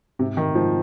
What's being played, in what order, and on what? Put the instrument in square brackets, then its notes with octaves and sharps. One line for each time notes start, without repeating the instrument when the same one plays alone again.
[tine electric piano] G#2 [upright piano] C3
[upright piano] D#3
[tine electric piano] G#2 [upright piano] F3